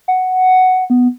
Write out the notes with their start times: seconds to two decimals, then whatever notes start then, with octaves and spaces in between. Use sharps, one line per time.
0.08 F#5
0.90 B3